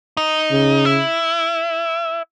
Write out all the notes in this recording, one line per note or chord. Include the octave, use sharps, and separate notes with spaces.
D#4
C#3
E4